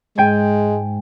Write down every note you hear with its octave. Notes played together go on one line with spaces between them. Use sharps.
G#2 G#3 G5 G#5